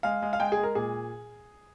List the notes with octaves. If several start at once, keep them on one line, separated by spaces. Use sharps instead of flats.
G#3 F5
G#3
F5
G#3 G5
G#4
G#3
A#4
A#2 G#4